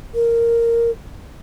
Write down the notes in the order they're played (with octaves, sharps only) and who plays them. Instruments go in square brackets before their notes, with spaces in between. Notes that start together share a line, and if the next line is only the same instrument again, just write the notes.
[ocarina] A#4